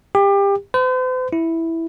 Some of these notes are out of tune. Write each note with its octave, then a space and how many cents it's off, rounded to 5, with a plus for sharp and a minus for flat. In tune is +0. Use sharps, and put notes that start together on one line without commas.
G4 +25
C5 -45
E4 -5